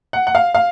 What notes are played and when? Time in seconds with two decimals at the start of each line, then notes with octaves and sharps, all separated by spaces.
0.13 F#5
0.27 F#5
0.35 F5
0.55 F5